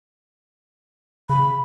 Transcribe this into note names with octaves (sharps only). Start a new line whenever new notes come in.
C#3 B5